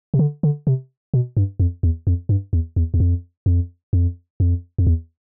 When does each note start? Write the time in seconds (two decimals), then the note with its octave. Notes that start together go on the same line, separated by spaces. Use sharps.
0.14 C3
0.19 D3
0.43 D3
0.67 C3
1.14 B2
1.37 G2
1.60 F2
1.83 E2
2.07 F2
2.29 G2
2.53 E2
2.76 E2
2.94 E2
3.00 F2
3.46 F2
3.93 F2
4.40 F2
4.78 F2
4.87 E2